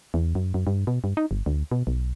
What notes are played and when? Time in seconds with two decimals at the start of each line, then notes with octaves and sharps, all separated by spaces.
0.14 E2
0.35 F#2
0.54 F#2
0.67 G2
0.87 B2
1.04 G2
1.17 D#4
1.31 G1
1.46 D2
1.71 B2
1.87 B1